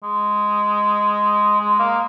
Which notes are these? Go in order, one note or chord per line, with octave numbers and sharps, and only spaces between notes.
G#3
G#3
A#3